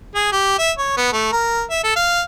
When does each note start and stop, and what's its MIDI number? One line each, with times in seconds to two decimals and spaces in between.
0.15 0.28 68
0.32 0.55 67
0.59 0.71 76
0.79 0.92 73
0.97 1.10 59
1.13 1.29 57
1.32 1.62 70
1.70 1.83 76
1.84 1.96 69
1.96 2.21 77